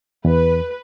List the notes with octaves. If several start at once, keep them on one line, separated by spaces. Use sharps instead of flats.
E2 B4